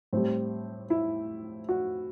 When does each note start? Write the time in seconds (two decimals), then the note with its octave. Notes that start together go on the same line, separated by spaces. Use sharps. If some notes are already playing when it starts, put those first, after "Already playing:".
0.13 A2 G3 C4
0.90 E4
1.69 F#4